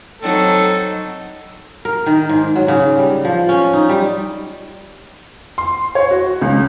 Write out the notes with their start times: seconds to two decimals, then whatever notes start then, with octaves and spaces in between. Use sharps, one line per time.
0.22 F#3 C4 D#4 A4
1.85 A#4
2.06 D#3
2.29 G#2
2.56 F#3
2.68 C#3
2.98 G3
3.25 F3
3.49 C#4
3.73 D#4
3.89 G3
5.58 C6
5.95 C#5
6.11 F#4
6.42 C#2